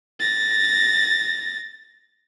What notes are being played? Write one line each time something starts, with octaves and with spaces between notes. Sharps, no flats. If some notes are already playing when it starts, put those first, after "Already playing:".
A6 A#6